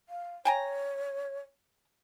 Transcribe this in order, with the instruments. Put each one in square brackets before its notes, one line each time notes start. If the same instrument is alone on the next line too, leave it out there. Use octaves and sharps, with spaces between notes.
[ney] F5
[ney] C#5 [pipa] G5 G#5 A#5